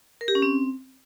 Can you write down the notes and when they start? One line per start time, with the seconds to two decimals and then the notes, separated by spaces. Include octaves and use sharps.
0.21 A#4
0.28 G4
0.35 C#4
0.42 C4